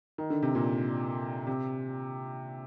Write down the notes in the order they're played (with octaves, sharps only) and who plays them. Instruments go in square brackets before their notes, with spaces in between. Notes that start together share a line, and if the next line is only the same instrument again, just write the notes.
[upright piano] D#3
D3
C3
A#2 D3
C3